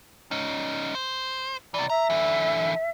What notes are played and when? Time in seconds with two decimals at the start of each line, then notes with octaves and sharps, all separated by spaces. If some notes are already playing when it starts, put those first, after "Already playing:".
0.31 C#4 D#4
0.95 C5
1.74 C3 E3 D5
1.90 E5 A#5
2.10 D3 E3